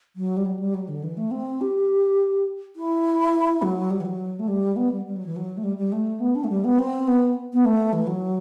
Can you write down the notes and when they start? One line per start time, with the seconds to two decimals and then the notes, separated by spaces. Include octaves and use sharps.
0.16 F#3
0.37 G3
0.45 F#3
0.59 G3
0.74 F#3
0.88 D3
1.04 E3
1.17 A3
1.31 C4
1.61 G4
2.76 E4
3.62 F#3
3.91 G3
4.01 E3
4.05 F#3
4.39 A3
4.48 G3
4.76 B3
4.92 G3
5.06 G3
5.16 F#3
5.26 E3
5.36 F#3
5.57 A3
5.64 G3
5.77 G3
5.92 A3
6.20 B3
6.35 D4
6.44 A3
6.50 G3
6.64 B3
6.79 C4
7.08 B3
7.53 B3
7.65 A3
7.93 E3
8.07 F#3